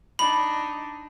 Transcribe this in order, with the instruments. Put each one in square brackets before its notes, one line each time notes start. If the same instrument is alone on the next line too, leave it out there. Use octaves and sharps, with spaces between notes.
[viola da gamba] D4 D#4 [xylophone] B5